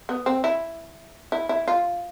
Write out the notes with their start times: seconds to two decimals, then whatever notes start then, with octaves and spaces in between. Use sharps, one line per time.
0.09 B3
0.26 C4
0.44 E4
1.32 E4
1.49 E4
1.68 F4